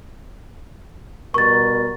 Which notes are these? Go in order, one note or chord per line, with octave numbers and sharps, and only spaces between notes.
B2 G3 A#4 C#6 A6